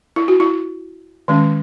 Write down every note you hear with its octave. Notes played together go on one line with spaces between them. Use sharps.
E4
F#4
E4
D#3 G#3 C#4